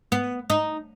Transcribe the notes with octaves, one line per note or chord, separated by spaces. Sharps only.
B3
D#4